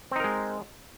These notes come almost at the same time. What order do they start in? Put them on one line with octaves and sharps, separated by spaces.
C4 D#4 A#4 G#3